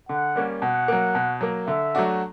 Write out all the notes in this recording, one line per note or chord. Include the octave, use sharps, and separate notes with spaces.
D3 F#5
G3 A#3 C#4
B2 F#5
F#3 A#3
B2
F#3 A#3
D3 E5
F#3 A3 D4 F#4